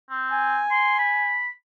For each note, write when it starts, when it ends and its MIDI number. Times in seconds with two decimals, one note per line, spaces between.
0.10 0.59 60
0.32 1.38 80
0.70 0.97 84
0.98 1.48 83